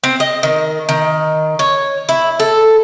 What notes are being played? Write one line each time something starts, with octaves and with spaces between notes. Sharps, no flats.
C4
D#5
D#3
D#3
C#5
E4
A4